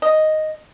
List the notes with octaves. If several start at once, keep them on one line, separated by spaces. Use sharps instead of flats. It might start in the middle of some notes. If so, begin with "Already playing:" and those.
D#5